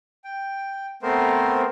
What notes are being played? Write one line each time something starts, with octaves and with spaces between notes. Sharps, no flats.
G5
A3 B3 C4 A#4 C5